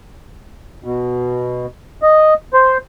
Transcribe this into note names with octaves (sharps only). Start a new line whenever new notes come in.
B2
D#5
C5